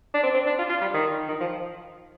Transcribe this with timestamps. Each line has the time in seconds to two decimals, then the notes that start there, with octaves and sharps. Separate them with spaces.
0.14 D4
0.23 C4
0.34 C4
0.46 D4
0.59 F4
0.69 F4
0.81 G3
0.94 D#3
1.28 D#3
1.40 F3